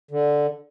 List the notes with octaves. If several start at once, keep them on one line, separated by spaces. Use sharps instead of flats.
D3